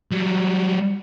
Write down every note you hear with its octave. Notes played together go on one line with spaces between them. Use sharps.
F#3 G3